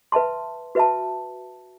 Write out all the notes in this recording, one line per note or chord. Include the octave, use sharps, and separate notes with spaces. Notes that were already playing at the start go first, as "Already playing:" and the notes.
B4 E5 A5 C6
F#4 B4 E5 A5